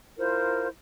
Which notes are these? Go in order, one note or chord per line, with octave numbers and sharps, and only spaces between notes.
E4 F4 A#4 C5